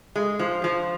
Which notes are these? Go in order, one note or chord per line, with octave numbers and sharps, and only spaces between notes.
G#3
F3
F3